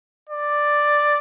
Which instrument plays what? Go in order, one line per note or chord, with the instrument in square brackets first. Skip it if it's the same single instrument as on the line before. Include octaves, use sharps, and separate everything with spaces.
[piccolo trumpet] D5